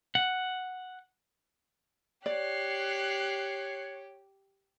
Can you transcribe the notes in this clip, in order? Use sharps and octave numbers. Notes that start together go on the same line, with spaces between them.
F#5
G4 C#5 D5 F#6 C7